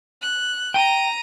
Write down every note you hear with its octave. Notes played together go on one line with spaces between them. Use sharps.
F#6
G5 A#5 D#7